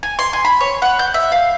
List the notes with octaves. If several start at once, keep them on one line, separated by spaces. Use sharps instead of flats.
G#5
C6
G#5
B5
C#5
F#5
G6
E5
F5